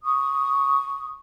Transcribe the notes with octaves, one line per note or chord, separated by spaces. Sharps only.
C#6 D#6